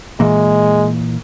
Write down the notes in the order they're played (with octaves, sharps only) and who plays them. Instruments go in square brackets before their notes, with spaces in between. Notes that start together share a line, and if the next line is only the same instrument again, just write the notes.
[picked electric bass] A#2 E3 A#3 [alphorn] G#3